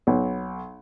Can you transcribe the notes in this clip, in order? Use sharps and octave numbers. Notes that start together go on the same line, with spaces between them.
B1